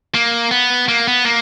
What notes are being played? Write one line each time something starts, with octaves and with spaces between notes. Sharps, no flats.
A#3
B3
A#3
B3
A#3